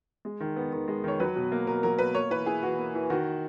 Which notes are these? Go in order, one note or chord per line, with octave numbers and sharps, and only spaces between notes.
G#3
D#3
B3
D#3
G#3
D#3 C#5
F#3 B4
B2
A#3
B2 A#4
F#3 A#4
B2 B4
A#3 C#5
E3 B4
E4 G#4
E3 F#4
A#3
E3
D#3 F#4